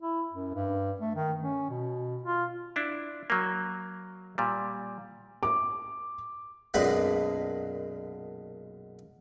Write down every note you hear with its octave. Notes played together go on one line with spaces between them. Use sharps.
E4
F#2
G2
A3
D#3
C#4
B2
F4
D4 E4
F#3 A#3
A#2 G3
D6
B1 F#2 A#2 G#3 D4 B4